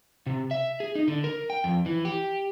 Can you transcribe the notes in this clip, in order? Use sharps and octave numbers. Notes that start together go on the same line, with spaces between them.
C3
E5
G#4
D#4
D3
A#4
G5
F2
E3
G4